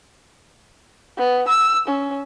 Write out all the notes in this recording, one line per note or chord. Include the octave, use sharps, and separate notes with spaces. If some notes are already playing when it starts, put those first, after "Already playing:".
B3
E6
C#4